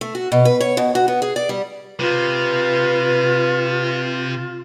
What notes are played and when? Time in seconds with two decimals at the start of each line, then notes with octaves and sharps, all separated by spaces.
0.01 A3
0.15 F#4
0.32 B2
0.45 B4
0.60 C#5
0.77 B2
0.95 F#4
1.08 B3
1.22 G#4
1.36 D5
1.49 G3
2.00 C3 F4 B4